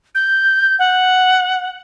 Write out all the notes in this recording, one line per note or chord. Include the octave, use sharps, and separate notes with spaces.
G6
F#5